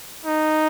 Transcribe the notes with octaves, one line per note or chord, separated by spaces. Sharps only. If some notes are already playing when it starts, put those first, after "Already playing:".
D#4